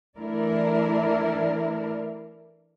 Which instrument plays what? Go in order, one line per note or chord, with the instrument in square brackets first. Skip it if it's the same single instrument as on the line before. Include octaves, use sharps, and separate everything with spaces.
[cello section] E3 A3 D4 E4 A#4 D5